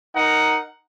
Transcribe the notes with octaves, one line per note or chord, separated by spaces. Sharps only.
D#4 A#4 F#5